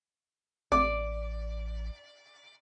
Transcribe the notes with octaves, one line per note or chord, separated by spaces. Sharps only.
A1 D5 D6